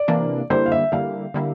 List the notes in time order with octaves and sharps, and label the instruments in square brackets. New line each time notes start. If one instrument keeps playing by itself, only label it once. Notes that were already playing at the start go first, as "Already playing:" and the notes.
Already playing: [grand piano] D5
[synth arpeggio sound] C3 E3 A#3 D4
[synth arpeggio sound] D3 G3 A#3 E4 [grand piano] C5
[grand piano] F5
E5
[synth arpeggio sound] D3 G3 A#3 E4 [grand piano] F5
[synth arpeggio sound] D3 G3 A#3 E4